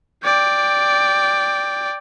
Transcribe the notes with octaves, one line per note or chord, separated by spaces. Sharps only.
D5 G5